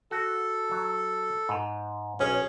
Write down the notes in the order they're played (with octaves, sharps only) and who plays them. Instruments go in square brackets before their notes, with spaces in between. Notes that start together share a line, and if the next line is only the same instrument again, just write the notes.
[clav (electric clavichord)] F#4 [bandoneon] A4
[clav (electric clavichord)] F#3
G#2
[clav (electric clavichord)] B1 [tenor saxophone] C#4 [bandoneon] G#4